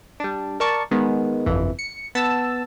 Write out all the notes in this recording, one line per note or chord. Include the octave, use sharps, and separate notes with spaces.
G3 D4
A#4 D5 A5 C#6
D#3 G#3 B3
G1 C2 F2 E3
C#7
B3 A5 E6